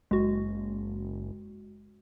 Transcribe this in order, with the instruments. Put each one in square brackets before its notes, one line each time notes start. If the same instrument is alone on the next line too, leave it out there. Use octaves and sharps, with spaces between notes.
[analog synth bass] F#1 [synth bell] G#3 F#4